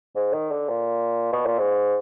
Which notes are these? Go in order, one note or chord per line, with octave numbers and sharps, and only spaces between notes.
G#2
D#3
D3
A#2
B2
A#2
G#2